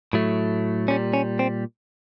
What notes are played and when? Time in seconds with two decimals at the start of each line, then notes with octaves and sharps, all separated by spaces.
0.13 A2 F#3 A3
0.88 A#2 G3 C#4
1.13 C#4
1.39 C4